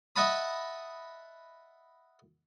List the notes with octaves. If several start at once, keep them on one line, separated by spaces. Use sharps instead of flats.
D#5 E5 F#5 A5 B5 D#6